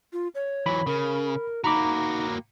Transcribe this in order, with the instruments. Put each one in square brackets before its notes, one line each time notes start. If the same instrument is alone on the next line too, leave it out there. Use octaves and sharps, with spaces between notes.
[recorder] F4
C#5
[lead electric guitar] E3 F#3 [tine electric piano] B5
[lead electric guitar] C#3 [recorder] A#4
[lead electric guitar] A#3 F#4 [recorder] D#4 [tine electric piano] A#5 B5 D6